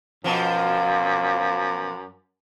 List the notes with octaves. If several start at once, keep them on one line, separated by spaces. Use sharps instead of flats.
F#2 B2 F3